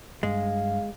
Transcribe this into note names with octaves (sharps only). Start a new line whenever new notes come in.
G2 G#3 F5